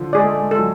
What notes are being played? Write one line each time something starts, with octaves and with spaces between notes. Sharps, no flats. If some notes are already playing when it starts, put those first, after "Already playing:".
Already playing: D3 F3
G#3 G#4 D5
A3
G#3
G#3 A4
F#3